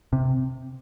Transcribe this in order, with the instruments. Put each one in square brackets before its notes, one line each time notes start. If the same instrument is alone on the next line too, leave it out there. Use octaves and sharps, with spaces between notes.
[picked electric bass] C3